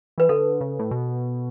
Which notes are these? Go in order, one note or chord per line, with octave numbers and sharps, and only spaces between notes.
E3 B4
D3 A4
C#3
A2
B2